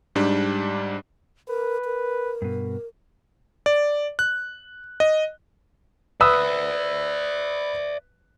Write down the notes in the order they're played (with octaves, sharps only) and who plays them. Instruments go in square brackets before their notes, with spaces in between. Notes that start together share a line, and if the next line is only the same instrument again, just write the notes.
[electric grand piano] G#2 G3 D4
[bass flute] A#4 [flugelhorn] B4
[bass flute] A#4
[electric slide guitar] G2 B2
[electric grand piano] D5
F#6
D#5
[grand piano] B4 D#6 E6 [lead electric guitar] D5 E5